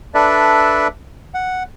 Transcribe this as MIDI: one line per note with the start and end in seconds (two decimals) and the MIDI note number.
0.14 0.88 62
0.14 0.88 69
0.14 0.88 71
0.14 0.88 74
0.14 0.88 76
1.34 1.63 78